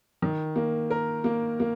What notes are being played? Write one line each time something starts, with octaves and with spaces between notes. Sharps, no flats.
D#3
A#3
A#4
A#3
A#3